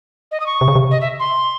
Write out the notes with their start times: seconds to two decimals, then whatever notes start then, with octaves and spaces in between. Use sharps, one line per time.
0.32 D#5
0.40 D#6
0.46 C#6
0.61 C3
0.68 C#3
0.75 C3
0.91 D#5
1.01 E5
1.20 C6